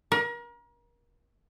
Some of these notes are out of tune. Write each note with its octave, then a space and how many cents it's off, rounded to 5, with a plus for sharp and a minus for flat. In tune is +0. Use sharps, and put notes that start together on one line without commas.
A#4 +35